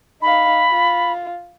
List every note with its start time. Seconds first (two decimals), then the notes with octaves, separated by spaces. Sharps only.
0.22 D#4 F5 B5
0.71 F4